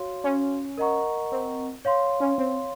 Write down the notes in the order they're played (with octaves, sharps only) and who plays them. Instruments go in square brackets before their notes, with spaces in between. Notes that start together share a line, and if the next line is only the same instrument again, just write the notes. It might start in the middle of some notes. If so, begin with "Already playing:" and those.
Already playing: [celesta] F#4 C#5 F5 C6
[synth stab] C#4
[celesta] A#4 D#5 F#5 A#5 C#6
[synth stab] C4
[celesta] C#5 F5 C6
[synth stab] C#4
C4